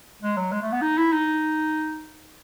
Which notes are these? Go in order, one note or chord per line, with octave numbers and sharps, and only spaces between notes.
G#3
F#3
G#3
A3
B3
D#4
E4
D#4